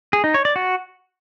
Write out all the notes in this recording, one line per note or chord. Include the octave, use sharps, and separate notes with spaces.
G#4
D#4
C#5
D5
F#4